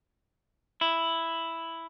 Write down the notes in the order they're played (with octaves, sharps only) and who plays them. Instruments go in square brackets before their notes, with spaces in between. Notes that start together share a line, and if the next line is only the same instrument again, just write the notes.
[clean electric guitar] E4